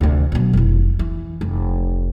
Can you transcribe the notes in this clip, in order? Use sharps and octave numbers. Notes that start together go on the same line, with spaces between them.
D2 C3
B2 F#3
F1 E4
E3
F1